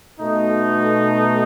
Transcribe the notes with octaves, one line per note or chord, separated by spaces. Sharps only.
B2 A3 D#4